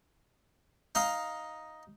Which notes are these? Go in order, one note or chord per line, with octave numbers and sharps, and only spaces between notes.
D#4 D#5 F5